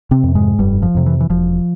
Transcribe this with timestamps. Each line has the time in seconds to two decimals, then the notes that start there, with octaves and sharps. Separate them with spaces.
0.11 C3 C4
0.24 F2 C3
0.35 G#2 G#3
0.59 F1 G2 G3
0.82 F3
0.94 F2 C3
1.06 E3
1.21 E3
1.30 E1 F3